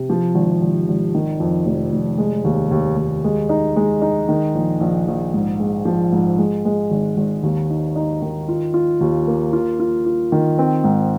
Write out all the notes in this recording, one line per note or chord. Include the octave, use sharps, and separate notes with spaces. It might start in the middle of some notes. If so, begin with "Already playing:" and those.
Already playing: C3
F3
G#1
G#1
G#1
D#3
F2
F1
F1
G#3
D#2
D#2
D#2
G#3
D#4
G#3
D#4
D#3
A#1
A#1
A#1
G#2
G#3
F3
G#2
G#3
G#3
G#1
G#1
D#2
D#4
D#4
D#3
F4
F4
D#2
A#3
F4
F4
F4
D#3
C4
G#2